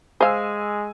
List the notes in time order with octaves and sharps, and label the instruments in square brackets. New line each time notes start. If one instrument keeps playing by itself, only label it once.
[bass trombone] G#3 [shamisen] C5 F5 [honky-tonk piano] G#5 E6